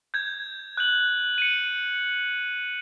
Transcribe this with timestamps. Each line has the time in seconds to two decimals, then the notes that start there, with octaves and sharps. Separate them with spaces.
0.14 G6 G#6
0.77 F#6 G6 F#7
1.38 C#7 D#7